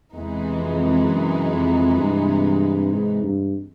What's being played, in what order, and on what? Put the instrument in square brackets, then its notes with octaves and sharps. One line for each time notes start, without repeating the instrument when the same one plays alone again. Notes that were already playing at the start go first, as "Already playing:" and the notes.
[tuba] E2 [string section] C3 E3 G#3 B3 D#4
[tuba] F2
F#2
F2
G2
G#2
G2